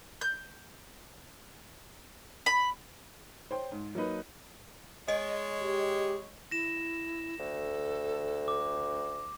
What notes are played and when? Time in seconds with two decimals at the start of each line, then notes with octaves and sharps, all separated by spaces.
0.21 G6
2.46 B5
3.51 C5 C#5 G5 C6
3.72 G#2
3.95 F#3 A#3 D#4 B4
5.08 G#3 C#5 D#5
5.60 G4
6.51 E4 A#6 E7
7.39 D2 A4
8.48 D6